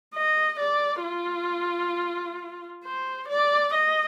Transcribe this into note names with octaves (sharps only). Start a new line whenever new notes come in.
D#5
D5
F4
C5
D5
D#5